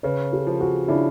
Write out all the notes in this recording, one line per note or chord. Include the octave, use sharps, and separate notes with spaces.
C#3 B4 C#5
G4 A4
F3
F#4 G#4
C#3 D4 E4